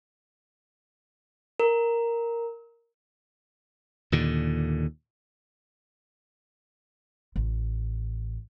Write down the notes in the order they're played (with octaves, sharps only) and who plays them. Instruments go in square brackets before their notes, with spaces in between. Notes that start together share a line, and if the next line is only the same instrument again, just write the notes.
[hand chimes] A#4
[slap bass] D#2 A#2 D3
[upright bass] A1